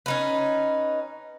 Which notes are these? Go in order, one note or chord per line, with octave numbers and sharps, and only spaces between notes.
C#4 D#4 B4